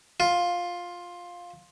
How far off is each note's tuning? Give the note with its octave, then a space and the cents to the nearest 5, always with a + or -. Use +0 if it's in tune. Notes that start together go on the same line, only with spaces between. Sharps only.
F4 +10